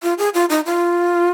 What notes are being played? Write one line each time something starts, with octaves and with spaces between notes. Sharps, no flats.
F4
G#4
F4
D#4
F4